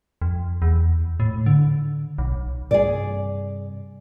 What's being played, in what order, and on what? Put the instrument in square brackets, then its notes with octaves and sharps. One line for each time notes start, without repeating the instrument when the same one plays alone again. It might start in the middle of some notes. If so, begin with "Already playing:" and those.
[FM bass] F2
E2
A2
D3
B1
[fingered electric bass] G2 C3 [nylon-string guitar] G#4 D5